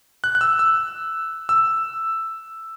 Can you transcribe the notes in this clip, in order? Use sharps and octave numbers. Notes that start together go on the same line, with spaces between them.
F#6
F#6
E6
E6
E6